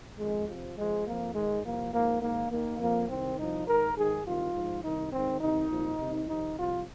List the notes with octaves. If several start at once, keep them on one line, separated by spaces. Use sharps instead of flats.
F2 D#3 G#3
F2 C3 F3
F2 F3 G#3
F2 F3 A#3
G#2 D#3 G#3
C2 C3 F3 A#3
G#2 F3 A#3
G#2 D#3 A#3
D#2 D#3 A#3
F2 F3 A#3
C2 C3 D#3 C4
C2 C3 F3 D#4
G#2 D#3 A#4
G#2 D#3 G#4
C2 C3 D#3 F4
G#2 F3
C2 C3 D#3 D#4
G#2 D#3 C4
C2 C3 D#3 D#4
C2 A#2 F3
C2 C3 D#3
F2 C3 D#3 D#4
C2 C3 F3 F4